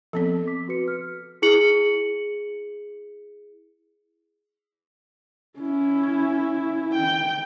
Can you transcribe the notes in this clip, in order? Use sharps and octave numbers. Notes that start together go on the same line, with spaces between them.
F3 B3 C4 A4
D6 B6
F#4 B4 C#7
F6
E4 G#4 C#7 F#7
C#4 E4
G5